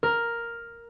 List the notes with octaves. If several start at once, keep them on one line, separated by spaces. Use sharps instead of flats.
A#4